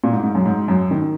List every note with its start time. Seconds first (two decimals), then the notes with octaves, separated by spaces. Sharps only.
0.04 A#2
0.13 G#2
0.23 G#2
0.35 F#2
0.46 G#2
0.68 F#2
0.91 D#3